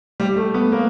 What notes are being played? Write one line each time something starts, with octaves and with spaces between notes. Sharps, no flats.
G3
A3
B3
A#3